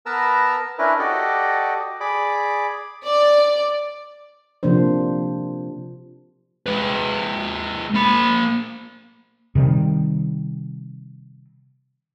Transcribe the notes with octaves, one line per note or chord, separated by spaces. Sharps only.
B3 A#4 B4 A5 A#5 E6
C#4 D4 E4 A#4 B4
F#4 G4 A4 D5 D#5
G#4 D5 B5 D6
D5
C3 F3 A#3 D4 C5
G#3 B4
A#3 B5
C3 D#3 G3